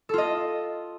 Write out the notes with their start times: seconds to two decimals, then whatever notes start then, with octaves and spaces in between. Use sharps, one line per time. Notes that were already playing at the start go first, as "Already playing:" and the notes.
0.09 A4
0.14 F4
0.18 D#5